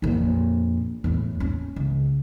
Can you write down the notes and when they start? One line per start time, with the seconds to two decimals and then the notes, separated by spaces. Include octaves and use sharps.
0.02 A#1 F2
1.04 E2 A2
1.40 C#4
1.76 C#2